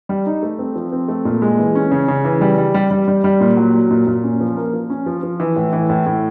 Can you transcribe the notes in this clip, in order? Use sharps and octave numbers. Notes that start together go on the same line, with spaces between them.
G3
D#4
A3
C4
F3
C4
A3
A#2
G#3
E3
C#4
C#3
C#3
E3
G3
G3
G3
G3
G3
G3
A#2
F#3
F#3
A#2
A#2
C#4
F3
A#3
F3
C#4
F3
F3
E3
A2
E3
A2
A2